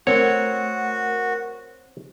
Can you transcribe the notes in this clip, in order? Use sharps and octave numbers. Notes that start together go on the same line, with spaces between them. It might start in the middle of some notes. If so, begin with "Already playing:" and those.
A3 C4 F#4 A#4 C#5 F#5